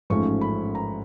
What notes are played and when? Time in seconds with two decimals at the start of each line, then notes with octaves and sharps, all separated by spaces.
0.10 A1 G#2 F3 A3 C#4 C#6
0.41 B5
0.75 A#5